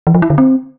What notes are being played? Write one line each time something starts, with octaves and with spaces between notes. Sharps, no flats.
E3
F3
E4
D3
C4